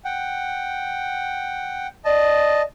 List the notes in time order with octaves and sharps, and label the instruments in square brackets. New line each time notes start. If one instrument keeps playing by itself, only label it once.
[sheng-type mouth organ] F#5 G5
[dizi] D5 [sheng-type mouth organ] D#5 A5